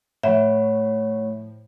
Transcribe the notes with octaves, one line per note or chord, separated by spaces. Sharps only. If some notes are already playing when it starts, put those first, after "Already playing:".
A2 F3 A3 C#5 E5 F#5 B5